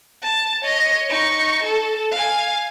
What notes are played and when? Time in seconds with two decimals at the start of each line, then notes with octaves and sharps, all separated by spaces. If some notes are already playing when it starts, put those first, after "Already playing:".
0.22 A5
0.62 C#5 D#5
1.09 D#4 C#6
1.63 A4
2.11 F5 G#5